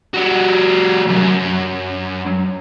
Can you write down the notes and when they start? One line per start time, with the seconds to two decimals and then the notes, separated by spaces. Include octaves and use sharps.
0.14 G3 F#4
1.08 C2 F#2